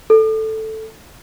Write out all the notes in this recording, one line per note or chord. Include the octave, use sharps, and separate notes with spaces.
A4